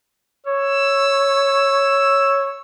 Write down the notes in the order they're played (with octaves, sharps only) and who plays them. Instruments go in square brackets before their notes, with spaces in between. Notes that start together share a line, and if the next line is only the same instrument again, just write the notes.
[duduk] C#5 [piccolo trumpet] E6